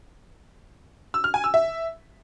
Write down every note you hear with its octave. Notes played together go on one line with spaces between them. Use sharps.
E6
F6
G#5
E6
E5